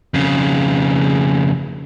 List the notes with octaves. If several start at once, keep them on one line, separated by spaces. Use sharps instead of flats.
F2 C#3